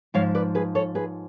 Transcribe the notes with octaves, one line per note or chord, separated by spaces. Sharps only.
G#2 F3 C#5 F5
B4 D5
G#4 B4
A4 C#5
G#4 B4